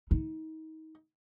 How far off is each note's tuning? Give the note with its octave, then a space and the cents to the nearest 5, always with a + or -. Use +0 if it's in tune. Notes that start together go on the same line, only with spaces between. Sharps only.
D#4 +30